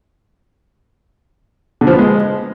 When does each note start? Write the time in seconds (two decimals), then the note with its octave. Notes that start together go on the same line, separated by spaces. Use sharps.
1.81 D3
1.87 F3
1.93 B3
1.99 G#3